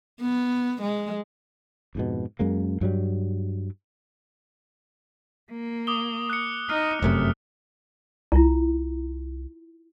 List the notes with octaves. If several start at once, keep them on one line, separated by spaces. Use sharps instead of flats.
B3
G#3
F2 G#2 B2
F#2 G#3 A#3
G2 F#3 G3
A#3
D6 D#6 G7
F#6 C#7
D#4 F6
F1 F#2 C3 A3
C2 E4 F4 A#5